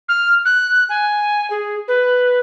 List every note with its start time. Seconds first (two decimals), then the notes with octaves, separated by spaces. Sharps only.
0.09 F6
0.45 F#6
0.89 G#5
1.50 G#4
1.88 B4